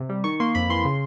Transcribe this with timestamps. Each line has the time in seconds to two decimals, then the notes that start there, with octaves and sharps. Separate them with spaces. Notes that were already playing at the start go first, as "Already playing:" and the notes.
Already playing: C3
0.09 G3
0.24 D#3 C#6
0.40 A#3 C6
0.55 F2 B5
0.70 E3 C6
0.85 C#3